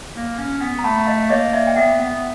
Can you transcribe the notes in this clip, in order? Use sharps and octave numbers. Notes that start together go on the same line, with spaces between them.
A#3
C#4
B3
A#5
A3 A5 B5
D#5 F5
A#3 C#5 D#5
D5 E5
G5
B3 E5 F#5
B3